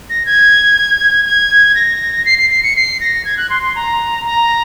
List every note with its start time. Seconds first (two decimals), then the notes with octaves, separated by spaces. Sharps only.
0.10 A#6
0.26 G#6
1.26 G#6
1.75 A#6
2.25 C7
2.38 C7
2.50 C7
2.63 C#7
2.76 C7
3.00 A#6
3.25 G#6
3.37 F#6
3.50 C6
3.63 C6
3.76 A#5
4.25 A#5